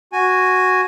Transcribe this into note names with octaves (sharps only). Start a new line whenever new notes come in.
F#4 G#5